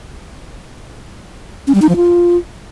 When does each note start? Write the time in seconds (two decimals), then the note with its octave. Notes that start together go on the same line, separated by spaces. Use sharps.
1.67 C#4
1.75 G3
1.82 D#4
1.89 F3
1.96 F4